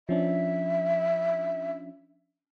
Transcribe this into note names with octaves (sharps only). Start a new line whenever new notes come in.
F3 C#4 D4 E5